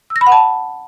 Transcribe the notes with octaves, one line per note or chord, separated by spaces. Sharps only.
E6
A#6
B5
F#5
A5